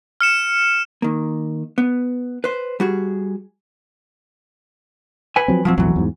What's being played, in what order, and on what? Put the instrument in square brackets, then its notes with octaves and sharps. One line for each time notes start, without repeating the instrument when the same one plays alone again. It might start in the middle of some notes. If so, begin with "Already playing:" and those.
[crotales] F6 C#7 E7
[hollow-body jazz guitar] D#3 A#3
B3
B4 C5
G3 F#4 G#4
B4 G#5
[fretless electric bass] F3 F#3 C4
[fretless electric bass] D1 [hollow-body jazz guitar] F3 F#3 C4
[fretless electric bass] B1 F2 A2 [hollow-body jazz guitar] E3 F#3
[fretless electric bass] E2 G#2